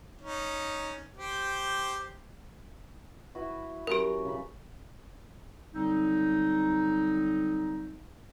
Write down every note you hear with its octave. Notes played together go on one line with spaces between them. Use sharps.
C#4 D#4
G4 C5 G5
E4 F#4 B4
F#3 C#4 G4 A#4 B4
C#3 B5
D3 F#3 G3 C4 D#4